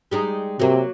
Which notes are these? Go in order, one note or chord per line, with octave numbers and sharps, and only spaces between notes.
G3 G#3 D#4
C3 F#3 A#3